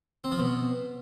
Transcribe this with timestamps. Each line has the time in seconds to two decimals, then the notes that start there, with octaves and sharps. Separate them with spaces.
0.24 C4
0.32 F3
0.39 B2